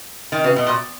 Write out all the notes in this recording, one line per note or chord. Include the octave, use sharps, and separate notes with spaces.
D#3
C#3 F#4 B4 E5
B2
A#2